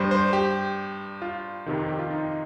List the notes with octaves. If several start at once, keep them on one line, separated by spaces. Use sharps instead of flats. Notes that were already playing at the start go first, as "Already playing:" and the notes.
Already playing: G2 G3 C5
C5
G4
F4
F2 C3 D#3
G4
F4
D#4